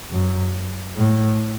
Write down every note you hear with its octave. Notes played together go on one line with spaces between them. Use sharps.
F#2
A2